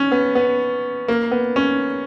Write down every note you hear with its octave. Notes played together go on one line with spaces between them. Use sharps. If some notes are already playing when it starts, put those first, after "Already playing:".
Already playing: C#4
B3
B3
A#3
B3
C#4